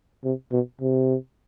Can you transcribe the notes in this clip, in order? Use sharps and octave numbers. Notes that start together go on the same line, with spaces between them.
C3
B2
C3